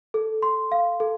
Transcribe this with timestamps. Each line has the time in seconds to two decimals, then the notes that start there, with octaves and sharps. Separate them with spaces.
0.14 A4
0.42 C6
0.72 F5
1.00 A4